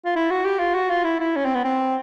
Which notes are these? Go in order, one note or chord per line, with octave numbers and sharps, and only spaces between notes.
F4
E4
F#4
G4
F4
F#4
F4
E4
E4
C#4
C4
B3
C4